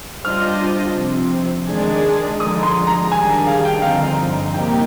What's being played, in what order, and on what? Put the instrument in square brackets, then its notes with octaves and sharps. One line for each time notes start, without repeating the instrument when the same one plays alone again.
[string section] G3 D4 F4 C5 D#5 [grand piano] F6
[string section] C3 F3 C4
D#3 G#3 D4 G#4 D5
[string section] D3 F3 G#3 D#4 [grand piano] D#6
[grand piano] C6
A#5
[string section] D#3 G3 D4 G#4 [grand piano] G#5
[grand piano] A#5
F5
G5
[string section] G2 D3 F3 C4 D#4 [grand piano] F5
[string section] C3 G3 A#3 D#4 G4 [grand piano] G5